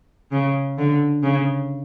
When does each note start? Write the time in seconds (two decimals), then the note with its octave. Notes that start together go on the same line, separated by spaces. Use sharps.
0.32 C#3
0.78 D3
1.23 C#3